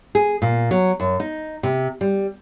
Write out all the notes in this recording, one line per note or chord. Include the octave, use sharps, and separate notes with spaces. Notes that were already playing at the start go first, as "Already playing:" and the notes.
G#4
A#2
F#3
F#2
D#4
C3
G3